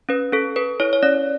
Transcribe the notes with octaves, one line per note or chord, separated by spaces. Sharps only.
C#4 B4
C#4 A4
A4 B4
E4 C#5
C#5
C#4 D5